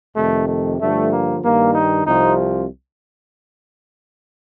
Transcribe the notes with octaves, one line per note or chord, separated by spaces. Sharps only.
F2 C3 D#3 A3
A3
G2 D3 F3 A3
A#3
G2 D#3 A#3
D#4
C2 C3 F3 D#4